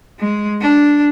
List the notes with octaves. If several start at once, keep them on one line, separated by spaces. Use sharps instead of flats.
G#3
D4